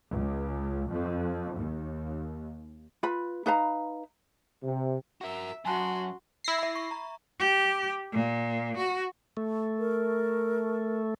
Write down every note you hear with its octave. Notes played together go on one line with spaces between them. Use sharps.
C#2
F2
D#2
F4 B4 B5
D#4 B4 F5 A#5
C3
F#4 A#4 E5
F#2 F#4 G#5 A5 C6 F#6
E4 A#6 C7
E5 B5
C#6
A#5
G4
A#2
F#4
A3
A#4